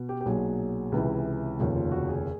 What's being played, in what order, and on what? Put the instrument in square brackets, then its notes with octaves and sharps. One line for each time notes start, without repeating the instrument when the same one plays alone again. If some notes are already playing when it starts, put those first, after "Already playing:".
Already playing: [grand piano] B2
G4
G4
B1 A#2 F#3 G#4
C#2 C3 E3
F1 D#2 C#3 F3
F4
F#4
G#4